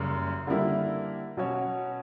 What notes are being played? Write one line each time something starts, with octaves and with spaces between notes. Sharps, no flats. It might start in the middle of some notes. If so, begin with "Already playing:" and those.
Already playing: F#1 F#2 C#3 G3
D3 G3 A#3 E4
B2 F#3 C#4 F#4 C#5